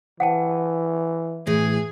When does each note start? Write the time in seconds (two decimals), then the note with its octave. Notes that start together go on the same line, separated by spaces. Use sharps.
0.20 E3 F#5 G5 A5
1.47 A2 E3 G#4